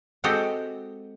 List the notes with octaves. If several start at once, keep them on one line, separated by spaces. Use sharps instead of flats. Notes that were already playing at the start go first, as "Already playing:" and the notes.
G#3 C4 F#4 G4 A4 D#5